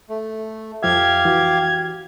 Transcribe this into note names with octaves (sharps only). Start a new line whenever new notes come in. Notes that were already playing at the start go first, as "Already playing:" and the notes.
A3
F2 F3 G4 E5 F5 G#6
E3 F#4